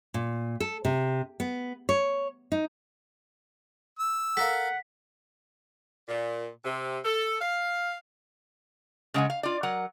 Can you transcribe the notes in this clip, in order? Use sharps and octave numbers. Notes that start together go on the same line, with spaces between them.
A#2
A4
C3
B3
C#5
D#4
E6
A4 A#4 F5 F#5 B6
A#2
C3
A4
F5
C#3 G#3 F#5 G#5
F5
F4 D5
F#3 A#4 F#5